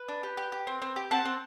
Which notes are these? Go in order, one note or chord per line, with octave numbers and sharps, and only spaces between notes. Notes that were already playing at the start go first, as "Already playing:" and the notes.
Already playing: B4
D4
G4
G4
G4
C4
C4
G4
C4 F#5 A5
C4